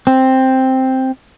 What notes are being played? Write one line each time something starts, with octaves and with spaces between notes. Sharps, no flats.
C4